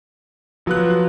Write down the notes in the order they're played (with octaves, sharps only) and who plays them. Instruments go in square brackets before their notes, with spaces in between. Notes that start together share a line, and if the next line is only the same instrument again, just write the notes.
[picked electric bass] F3 [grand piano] F#3 B3 F#6